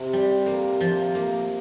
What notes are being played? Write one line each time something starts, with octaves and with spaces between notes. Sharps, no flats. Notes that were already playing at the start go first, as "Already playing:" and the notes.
Already playing: C3
G3
A#3
F3
A#3